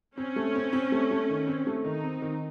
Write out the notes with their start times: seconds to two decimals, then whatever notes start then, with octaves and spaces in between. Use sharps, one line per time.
0.17 C4 C#4
0.36 A3
0.55 C4
0.73 C4
0.92 A3
1.11 A3
1.29 D#3
1.47 C4
1.67 A3
1.84 D#3 D#4
2.03 C4
2.22 D#3